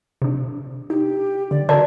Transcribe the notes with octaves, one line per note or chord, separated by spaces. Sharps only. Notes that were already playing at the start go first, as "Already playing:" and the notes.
C3 D4
D#4 G4
D3 D5
D3 F#4 A#4 D5 G#5 A5